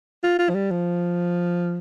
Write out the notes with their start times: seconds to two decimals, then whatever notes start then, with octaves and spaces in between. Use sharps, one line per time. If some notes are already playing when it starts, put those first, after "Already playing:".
0.23 F4
0.39 F4
0.49 F3
0.54 G3
0.71 F3